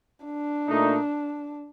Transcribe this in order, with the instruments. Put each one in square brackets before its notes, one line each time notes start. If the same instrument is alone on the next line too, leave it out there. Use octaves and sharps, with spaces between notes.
[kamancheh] D4
[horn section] A#2 A3 D#4